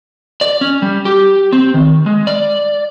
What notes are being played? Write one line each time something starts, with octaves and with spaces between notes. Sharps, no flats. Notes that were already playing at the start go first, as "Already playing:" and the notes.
D5
C#4
G3
G4
C4
D#3
G#3
D5